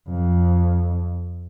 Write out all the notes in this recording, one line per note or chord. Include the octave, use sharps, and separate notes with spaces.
F2